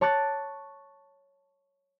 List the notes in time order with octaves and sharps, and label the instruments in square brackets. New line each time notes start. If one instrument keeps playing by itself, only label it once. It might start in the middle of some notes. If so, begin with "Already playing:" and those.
[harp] C#5 A5 C#6 D6 F#6 A6